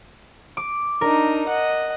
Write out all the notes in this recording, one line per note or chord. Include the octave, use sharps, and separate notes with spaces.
D6
D4 D#4 A#4
D#5 F#5